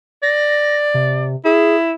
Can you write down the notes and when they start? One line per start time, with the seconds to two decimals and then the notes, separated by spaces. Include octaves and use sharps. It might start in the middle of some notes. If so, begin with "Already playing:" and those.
0.23 D5 A#6
0.94 C3
1.45 E4 G#4